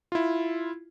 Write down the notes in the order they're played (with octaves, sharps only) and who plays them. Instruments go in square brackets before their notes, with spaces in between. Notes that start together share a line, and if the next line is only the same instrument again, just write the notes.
[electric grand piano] E4 F4